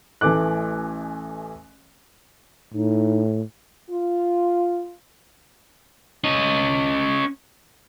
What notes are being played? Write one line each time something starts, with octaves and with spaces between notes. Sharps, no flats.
A1 E3 A3 D6 F#6
A2 D#4
F4
C#4 D#5